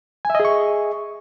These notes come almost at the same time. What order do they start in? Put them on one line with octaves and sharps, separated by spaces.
G#5 E5 D#5 G#4 C#6